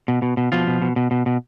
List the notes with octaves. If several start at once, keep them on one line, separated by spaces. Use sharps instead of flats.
B2
B2
B2
B2 F3 F4
B2
B2
B2
B2
B2